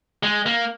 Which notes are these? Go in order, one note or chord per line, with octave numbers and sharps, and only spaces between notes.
G#3
A#3